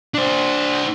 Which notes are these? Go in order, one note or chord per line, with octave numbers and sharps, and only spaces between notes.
D4 C5